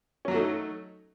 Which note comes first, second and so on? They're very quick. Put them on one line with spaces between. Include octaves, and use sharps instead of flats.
C#4 F#3 F#4 A3 D#4